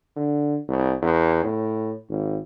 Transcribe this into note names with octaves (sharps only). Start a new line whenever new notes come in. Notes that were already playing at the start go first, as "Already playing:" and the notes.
D3
C2
E2
A2
G#1